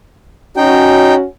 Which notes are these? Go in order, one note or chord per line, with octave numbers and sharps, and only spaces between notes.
C#4 D#4 F#4 G5